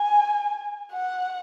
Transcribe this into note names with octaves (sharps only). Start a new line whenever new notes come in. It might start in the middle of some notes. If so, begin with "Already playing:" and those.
Already playing: G#5
F#5